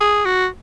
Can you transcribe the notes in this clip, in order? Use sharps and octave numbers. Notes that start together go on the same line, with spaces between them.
G#4
F#4